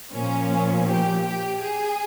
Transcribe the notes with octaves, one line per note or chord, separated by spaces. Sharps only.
A#2 F3 C#4
G4
G4
G#4